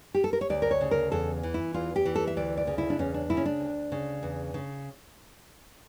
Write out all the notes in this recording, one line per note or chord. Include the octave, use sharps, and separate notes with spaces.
G4
A4
A#4
C#5
D2 D5
A#4
C#5
C#3
A#4
E2 A4
E3
E4
E2 F4
G4
E3
A4
E5
D2 D5
D5
C#3
E4
D4
E2 C#4
D4
C#3 E4
C#4
D4
D2
C#3
E2
C#3